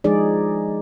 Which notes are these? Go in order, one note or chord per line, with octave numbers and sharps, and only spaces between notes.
F3 G#3 D#4 G#4 D5